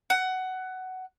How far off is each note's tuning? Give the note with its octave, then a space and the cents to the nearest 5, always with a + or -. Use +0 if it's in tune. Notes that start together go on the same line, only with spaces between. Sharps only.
F#5 +15